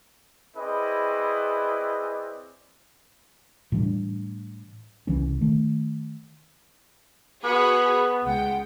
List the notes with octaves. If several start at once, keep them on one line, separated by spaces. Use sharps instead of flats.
C4 E4 G#4 B4 D5 D#5
A2 E3 G3 D4
C2 C#3 E3 C#4
D#3 A3
B3 F#4 G#4 B5 C#6
C#2 G#3 F#5 G5